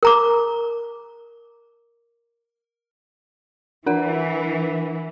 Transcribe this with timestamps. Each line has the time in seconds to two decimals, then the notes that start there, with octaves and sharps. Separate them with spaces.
0.03 A#4 A#5 D6
3.86 E3 D4 A#4 F#5